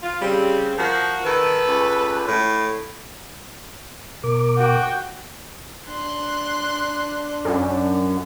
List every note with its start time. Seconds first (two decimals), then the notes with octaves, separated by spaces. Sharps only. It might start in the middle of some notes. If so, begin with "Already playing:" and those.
0.03 F4
0.21 C#3 G3 C4
0.78 F3 F#4 A#4
1.25 D#3 A4 B4
1.68 C#2
2.28 A2
4.24 B2 A#4 D6
4.58 F#4 G5
5.89 D4 C6 F#6
7.45 F#2